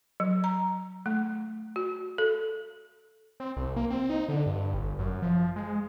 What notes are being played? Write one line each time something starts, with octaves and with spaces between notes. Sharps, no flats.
F#3
A#5
A3
F#4
A4
C4
C2
A#3
C4
D#4
D3
G2
G1
F#2
F3
G#3